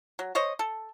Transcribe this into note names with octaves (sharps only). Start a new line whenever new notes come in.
F#3
C5 C#5 D#5
A4